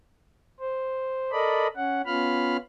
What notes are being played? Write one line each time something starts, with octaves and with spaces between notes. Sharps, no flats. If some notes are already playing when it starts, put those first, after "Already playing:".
C5
A4 A#4 D5 D#5 B5
C#4 F#5
B3 C#4 F4 F5 B5 F6